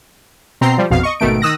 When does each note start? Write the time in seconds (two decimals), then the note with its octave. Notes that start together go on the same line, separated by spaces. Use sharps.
0.61 B2 C4 A#5 C6 C7
0.78 F3 G3
0.91 A#1 F2 B2 F5
1.03 D#5 C#6
1.20 G#1 B2 D#3 A3 D7
1.42 D#3 D#6 E6 F#6 A#6